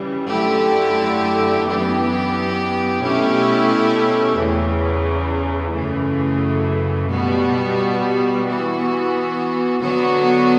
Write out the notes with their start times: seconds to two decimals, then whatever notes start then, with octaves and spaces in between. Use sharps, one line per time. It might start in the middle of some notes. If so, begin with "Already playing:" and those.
Already playing: C#3 E3 G3
0.29 F#2 D3 A3 E4 G4
1.65 F#2 E3 B3 D4 G4
3.01 B2 A3 C#4 E4 G4
4.36 E2 C#3 E3
5.73 F#2 C#3 E3 A3
7.08 B2 G3 B3 F#4
8.44 E3 B3 F#4
9.81 D3 F#3 B3 F#4